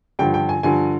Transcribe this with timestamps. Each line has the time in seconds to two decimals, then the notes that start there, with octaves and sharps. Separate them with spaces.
0.19 G2 D3 F3 G5
0.34 G5
0.49 G#5
0.63 G2 D3 F3 G#5